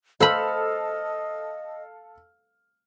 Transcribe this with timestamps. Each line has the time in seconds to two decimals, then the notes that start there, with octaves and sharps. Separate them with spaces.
0.20 A4 C5 D#5 F5 B5 E6 F6